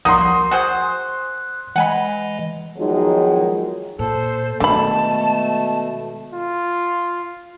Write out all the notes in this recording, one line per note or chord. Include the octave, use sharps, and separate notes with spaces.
C2 F3 A#3 D#4 F#4 C6 D#6
F#4 G#4 C5 F#6
E3 G#3 D#5 F#5 G#5 B5
E2 D#3 F3 F#3 G#3 D#4
A#2 A4 C5
B2 D3 D#3 G#3 A3 A5 B5
F4